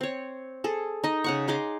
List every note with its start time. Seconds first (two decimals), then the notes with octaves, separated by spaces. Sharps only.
0.01 C4 C#5
0.64 G#4 A4
1.04 D#4 D#5
1.24 C#3 F#5 C#6
1.48 D#4 G#4 C6 D6